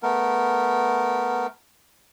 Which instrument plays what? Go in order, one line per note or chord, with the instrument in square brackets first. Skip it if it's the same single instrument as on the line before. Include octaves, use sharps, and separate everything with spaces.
[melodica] A3 B3 A#4